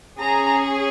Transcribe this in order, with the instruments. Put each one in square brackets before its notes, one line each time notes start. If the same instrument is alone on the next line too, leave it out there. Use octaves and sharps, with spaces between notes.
[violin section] C#4 G#4 A#5